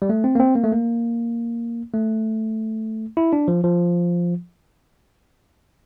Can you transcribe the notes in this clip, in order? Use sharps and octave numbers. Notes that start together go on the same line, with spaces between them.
G3
A3
C4
A#3
C4
A#3
A3
A#3
A3
E4
D4
F3
F3